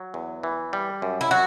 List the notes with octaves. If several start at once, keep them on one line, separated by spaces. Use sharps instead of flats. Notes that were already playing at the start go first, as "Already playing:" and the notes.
Already playing: F#3
E2
E3
G3
F#2
E4
F#3 F#4